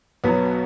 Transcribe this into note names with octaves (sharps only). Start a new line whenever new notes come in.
B1 B2 F#3 B3